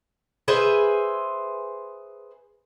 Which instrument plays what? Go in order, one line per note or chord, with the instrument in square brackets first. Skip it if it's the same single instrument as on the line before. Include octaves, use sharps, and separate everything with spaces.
[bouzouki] G#4 B4 C5 E5